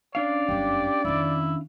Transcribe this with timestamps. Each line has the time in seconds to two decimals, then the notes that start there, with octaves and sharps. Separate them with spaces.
0.15 C#4 D4 D5 F5
0.49 G1 F#2 G4
1.05 F2 D#3 E4